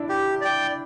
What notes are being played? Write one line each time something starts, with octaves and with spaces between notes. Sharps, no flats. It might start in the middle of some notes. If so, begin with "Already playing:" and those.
Already playing: D4 E4
G4
D5 G5